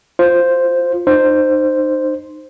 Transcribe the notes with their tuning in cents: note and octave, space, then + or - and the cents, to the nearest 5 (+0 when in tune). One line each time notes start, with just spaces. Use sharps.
F4 +0 C5 +0
D#4 -30 C5 +0